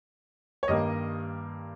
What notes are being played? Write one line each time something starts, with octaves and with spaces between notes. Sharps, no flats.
C#5
G2 D#3 G3 A#3 D#5